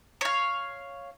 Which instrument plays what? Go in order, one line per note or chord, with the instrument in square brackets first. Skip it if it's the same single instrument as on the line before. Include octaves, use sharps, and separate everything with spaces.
[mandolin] C#5 F5